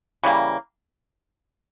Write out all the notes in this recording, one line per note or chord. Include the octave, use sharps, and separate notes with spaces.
C#3 E3 G3 A#3